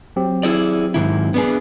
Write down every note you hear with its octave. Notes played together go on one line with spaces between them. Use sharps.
F#3 C4 G4
E4 G#4 D5
G#2 D#3 E4
B3 D4 G#4